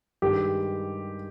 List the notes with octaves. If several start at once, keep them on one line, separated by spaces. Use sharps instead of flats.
G2 D#3 G#3 G4